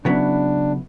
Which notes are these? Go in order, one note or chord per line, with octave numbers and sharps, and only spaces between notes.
C#3 F#3 B3 D4 E4